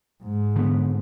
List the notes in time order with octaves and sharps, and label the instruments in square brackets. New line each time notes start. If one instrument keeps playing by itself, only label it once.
[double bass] G#2
[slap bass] D3 B3